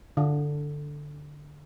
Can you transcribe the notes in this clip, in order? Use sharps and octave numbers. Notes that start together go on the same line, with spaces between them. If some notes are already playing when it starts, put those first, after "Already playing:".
D3